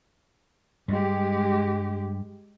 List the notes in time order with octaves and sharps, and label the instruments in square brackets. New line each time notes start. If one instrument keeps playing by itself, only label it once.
[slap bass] G2 G3 [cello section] G#3 G4